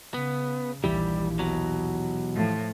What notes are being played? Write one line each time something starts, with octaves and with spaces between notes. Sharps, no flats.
C#3 B3
A#1 D#2 E3 G3 E4 G4
B2 F#3
A2 F3